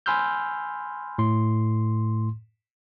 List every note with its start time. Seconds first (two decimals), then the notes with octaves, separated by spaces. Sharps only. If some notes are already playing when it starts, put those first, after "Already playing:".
0.06 G#5 B5 C6 E6 F6 G6
1.18 A2 C6